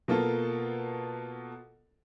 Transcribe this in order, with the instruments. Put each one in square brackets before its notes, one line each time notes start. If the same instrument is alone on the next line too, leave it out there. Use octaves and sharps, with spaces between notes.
[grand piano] B2 A#3 F4 A4